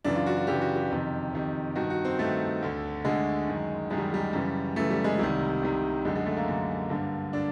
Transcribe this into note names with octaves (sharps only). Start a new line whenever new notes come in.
F#2 C#3 E3 D4
F4
F#4
F#4
F#2 C#3 E3 G4
F#4
G4
F2 C3 D#3
F2 C3 D#3
G2 D#3 F#4
F#4
C4
G2 D#3 A3
D2 D3
D2 D3 G#3
F#2 D#3
F#2 D#3 G#3
G3
G3
F#2 C#3 E3
F#2 C#3 E3 A3
G3
G#3
C2 C3 D#3 G3
C2 C3 D#3
F#2 D3 G#3
G#3
A3
A#3
F#2 D3
G2 D3
D3 D4